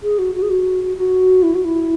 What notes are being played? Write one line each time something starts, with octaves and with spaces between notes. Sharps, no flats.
G#4
F#4
F#4
G#4
F#4
F#4
E4
F#4
E4